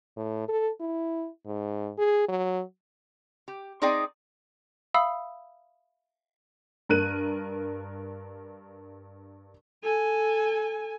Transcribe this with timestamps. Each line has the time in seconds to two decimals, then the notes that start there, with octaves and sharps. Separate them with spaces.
0.17 A2
0.49 A4
0.81 E4
1.46 G#2
1.98 G#4
2.29 F#3
3.48 G4
3.82 C4 D#4 G#4 D5 D#5 G5
4.94 E5 F5 B5 D#6 E6
6.89 G2 A#4 F#6 D#7
9.83 A4 G#5